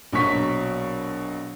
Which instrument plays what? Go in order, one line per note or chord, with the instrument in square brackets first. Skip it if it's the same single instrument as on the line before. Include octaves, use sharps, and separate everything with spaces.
[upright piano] A#1 B2 F#3 C#6 B6